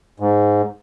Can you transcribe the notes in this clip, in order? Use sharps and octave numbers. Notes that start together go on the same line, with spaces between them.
G#2